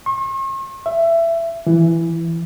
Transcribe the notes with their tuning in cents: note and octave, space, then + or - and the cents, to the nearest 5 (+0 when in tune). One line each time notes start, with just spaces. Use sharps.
C#6 -45
E5 +20
E3 +10